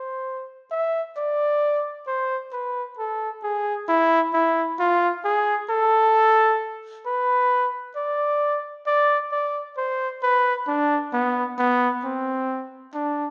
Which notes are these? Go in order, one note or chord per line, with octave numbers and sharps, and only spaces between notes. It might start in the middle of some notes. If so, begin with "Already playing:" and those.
Already playing: C5
E5
D5
C5
B4
A4
G#4
E4
E4
F4
G#4
A4
B4
D5
D5
D5
C5
B4
D4
B3
B3
C4
D4